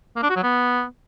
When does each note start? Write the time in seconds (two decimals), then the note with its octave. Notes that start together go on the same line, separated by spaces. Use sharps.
0.16 A#3
0.23 D4
0.30 F#4
0.36 F#3
0.43 B3